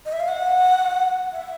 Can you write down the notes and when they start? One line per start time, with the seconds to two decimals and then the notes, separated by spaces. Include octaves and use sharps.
0.06 D#5
0.13 E5
0.20 F5
0.28 F#5
1.32 E5